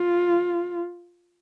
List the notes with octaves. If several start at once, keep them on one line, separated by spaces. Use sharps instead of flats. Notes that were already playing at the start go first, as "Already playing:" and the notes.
Already playing: F4